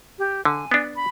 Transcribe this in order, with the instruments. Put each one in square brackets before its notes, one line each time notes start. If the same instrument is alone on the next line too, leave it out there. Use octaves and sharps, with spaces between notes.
[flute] G4
[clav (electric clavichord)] D3 [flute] G#5
[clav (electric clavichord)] B3 D4
[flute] B5